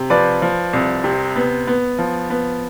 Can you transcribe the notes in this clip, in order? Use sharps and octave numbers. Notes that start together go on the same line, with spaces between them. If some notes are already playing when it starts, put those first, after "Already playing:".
Already playing: C3
F3 B4 D5
F3
C2
C3
B3
B3
F3
B3